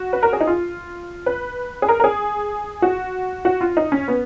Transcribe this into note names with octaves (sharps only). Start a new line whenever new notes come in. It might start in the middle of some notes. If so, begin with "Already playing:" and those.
Already playing: F#4
B4
A#4
G#4
D#4
F4
B4
G#4
A#4
A#4
G#4
F#4
F#4
F4
D#4
C#4
B3